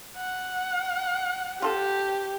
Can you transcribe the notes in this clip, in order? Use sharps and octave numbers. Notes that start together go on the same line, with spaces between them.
F#5
F4 G4 A4